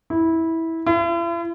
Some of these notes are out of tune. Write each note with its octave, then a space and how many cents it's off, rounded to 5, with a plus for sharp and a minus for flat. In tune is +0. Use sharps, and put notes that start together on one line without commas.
E4 -15
E4 +45